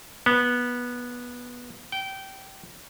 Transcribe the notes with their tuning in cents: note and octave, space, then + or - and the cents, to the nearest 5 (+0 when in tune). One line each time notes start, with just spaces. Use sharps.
B3 -15
G5 -20